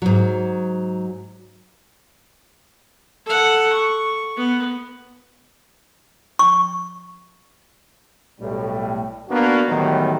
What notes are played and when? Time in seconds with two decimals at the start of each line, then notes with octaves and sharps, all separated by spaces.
0.02 G#2 F#3
3.26 A4 F#5
3.73 C#6
4.37 B3
6.39 C#6
8.41 B1 A2 G3
9.29 A#3 B3 D4 F#4
9.68 A2 D#3 E3 F#3 G3 B3